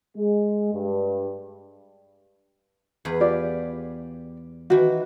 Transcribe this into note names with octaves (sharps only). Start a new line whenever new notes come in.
G#3
G2
E2 G#4 B4
F4 G4 D5
D#3 E3 F#4